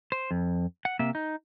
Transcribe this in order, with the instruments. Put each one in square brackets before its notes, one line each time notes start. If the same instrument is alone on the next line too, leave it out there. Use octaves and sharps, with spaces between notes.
[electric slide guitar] C5
F2
F#5
C3 A#3 E5
D#4